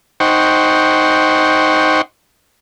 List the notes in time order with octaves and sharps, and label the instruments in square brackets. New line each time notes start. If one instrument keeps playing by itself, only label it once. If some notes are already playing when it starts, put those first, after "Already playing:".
[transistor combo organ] D#4 C5 F#5 G5 C#6